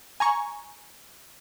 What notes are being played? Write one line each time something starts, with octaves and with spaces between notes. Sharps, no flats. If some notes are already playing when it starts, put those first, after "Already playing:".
G#5 A#5 C#6